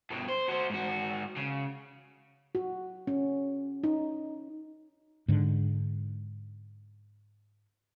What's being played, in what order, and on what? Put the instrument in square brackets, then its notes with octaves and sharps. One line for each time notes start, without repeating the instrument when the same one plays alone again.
[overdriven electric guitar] G2 B2
C5
F#4 C5
G#2 F#4
C#3
[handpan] F#4
C#4
D#4
[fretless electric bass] G#2 D3